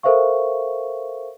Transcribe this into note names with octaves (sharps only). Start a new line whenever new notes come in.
A4 A#4 C5 E5 F5 C#6